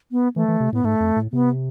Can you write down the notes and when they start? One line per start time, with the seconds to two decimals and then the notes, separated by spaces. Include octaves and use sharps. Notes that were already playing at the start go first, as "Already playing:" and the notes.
0.12 B3
0.36 E3 A3
0.48 E3
0.60 C3
0.72 A2 B3
0.84 G#2 A3
1.00 F2
1.16 A2
1.33 C3 B3